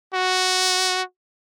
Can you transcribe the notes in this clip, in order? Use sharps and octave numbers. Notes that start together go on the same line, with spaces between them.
F#4